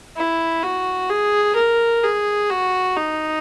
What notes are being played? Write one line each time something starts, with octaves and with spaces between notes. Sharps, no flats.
E4
F#4
G#4
A#4
G#4
F#4
D#4